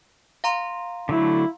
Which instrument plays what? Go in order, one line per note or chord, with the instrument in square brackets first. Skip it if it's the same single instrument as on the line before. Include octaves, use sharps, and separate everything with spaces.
[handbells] F5 A#5 C6
[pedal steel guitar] D3 F#3 A3 [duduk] E4